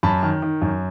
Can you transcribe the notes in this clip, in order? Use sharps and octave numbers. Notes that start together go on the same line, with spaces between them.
F#2 A5 B5
D#3
D#3
F#2